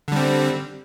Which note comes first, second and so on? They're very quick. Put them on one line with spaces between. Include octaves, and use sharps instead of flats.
D3 G3 C4